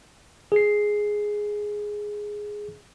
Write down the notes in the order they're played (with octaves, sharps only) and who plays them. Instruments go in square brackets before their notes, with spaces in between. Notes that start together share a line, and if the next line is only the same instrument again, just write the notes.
[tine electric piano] G#4 C7